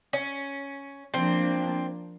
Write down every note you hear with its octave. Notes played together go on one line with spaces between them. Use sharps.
C#4
F3 A#3 C4 D4